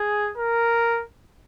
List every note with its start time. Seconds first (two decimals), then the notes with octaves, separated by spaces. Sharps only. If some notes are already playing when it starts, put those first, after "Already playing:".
Already playing: G#4
0.37 A#4